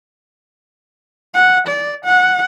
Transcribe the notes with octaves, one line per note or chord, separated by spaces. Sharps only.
F#5
D5
F#5